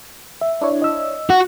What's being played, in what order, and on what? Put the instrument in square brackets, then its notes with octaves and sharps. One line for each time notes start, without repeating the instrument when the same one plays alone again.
[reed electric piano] E5
[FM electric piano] D4 E4 C#5
[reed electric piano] D#5 E6
[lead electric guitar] F#4 [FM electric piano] F#5